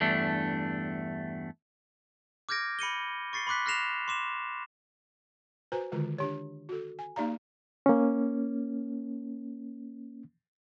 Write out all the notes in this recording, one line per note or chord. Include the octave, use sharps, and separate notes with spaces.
E2 G2 A3 D4
D6 F6 G6 G#6 A#6 D7
B5 C#7 D#7 G7
C#6 A6 C7 C#7 G7
B5 C6 D6 F#6 B6
F6 F#6 A#6 C7 E7 F7
C6 D6 E7 F7
F#4 B4 C5 G#5 A#5
D3 D#3 G#3 F4 B4
D4 G4 C#5
F#4 A4
G#5
A#3 D#4 G4 D5 F5 A#5
A#3 C#4